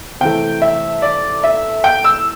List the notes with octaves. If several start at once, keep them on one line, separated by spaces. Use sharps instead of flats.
C3 E3 A3 G5
E5
D5
E5
G5
E6